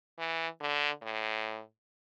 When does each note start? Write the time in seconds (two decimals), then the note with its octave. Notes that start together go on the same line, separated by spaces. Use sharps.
0.18 E3
0.61 D3
1.02 A2